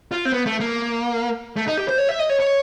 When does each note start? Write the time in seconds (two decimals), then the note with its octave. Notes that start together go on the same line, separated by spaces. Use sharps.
0.12 F4
0.25 C4
0.32 B3
0.46 A3
0.60 A#3
1.57 A3
1.67 D#4
1.77 G4
1.88 C5
1.98 C#5
2.09 E5
2.19 D#5
2.30 C#5
2.40 C#5